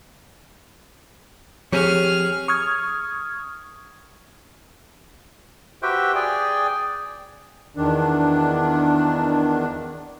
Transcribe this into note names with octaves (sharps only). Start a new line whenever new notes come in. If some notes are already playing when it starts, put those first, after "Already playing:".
F3 C4 G4 G#4 C#5 F6
C#6 D#6 F6 G#6
F#4 G4 B4 C5 E5 G5
G#4 D5 G5 G#5
E2 D#3 D4